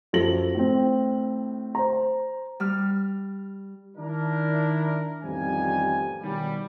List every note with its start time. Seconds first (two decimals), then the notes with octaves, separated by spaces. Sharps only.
0.13 F#2 F3 A4 A#6 F#7
0.55 A2 C4
1.75 C5 A#5
2.60 G3 F6
3.97 D#3 D4 E4 A#4
5.23 A1 F2 D#3 F3 G3 G#5
6.22 B2 D#3 E3 F#3 G3